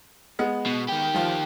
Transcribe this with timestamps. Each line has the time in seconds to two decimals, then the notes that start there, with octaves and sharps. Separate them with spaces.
0.39 G#3 B3
0.66 B2
0.89 D#3 G4
1.14 F3 F4